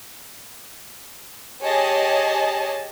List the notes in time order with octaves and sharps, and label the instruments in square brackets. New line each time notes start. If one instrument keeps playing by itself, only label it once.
[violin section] G4 G#4 C#5 D#5 G#5 A5